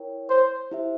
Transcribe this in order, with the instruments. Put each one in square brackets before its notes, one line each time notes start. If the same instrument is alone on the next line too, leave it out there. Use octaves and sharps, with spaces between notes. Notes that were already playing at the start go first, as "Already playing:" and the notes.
Already playing: [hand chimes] E4 A#4 C#5 G5
[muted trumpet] C5
[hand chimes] E4 G4 C5 E5